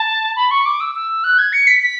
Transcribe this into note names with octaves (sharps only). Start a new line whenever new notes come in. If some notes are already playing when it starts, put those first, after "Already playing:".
Already playing: A5
B5
C#6
D6
E6
E6
F#6
G#6
C#7
B6
B6